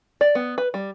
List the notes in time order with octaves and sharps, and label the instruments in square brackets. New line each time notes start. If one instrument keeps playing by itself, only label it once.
[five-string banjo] D5
B3
B4
G3